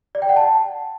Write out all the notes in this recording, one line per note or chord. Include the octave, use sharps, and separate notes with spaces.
D5
G5
F#5
A5